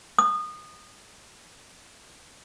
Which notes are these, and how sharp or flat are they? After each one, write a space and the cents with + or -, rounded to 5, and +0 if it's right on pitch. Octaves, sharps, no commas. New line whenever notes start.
D#6 -25